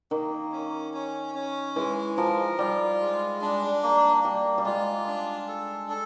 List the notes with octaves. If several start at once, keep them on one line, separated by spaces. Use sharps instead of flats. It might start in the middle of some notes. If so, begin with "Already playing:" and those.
D#3 A#3
C#4
C#4
C#4
E3 G#3
F3 A#4
G3 F4
G#3
D4
A#3
G3 A#3
G3
G#3 F4
D4
A4
A4